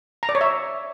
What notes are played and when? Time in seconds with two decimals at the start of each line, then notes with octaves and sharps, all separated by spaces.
0.23 A#5
0.29 D5
0.35 C#5
0.41 E5